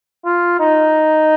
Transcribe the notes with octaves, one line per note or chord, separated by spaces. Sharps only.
F4
D#4